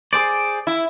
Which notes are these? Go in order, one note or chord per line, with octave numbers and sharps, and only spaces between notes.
G#4 C5 D5
E4